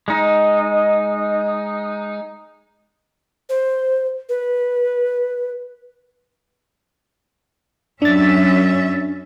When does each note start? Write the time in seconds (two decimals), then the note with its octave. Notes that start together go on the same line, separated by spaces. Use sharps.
0.08 G#3 D#4
3.49 C5
4.29 B4
8.02 F#2 C#4 D4 E5 A6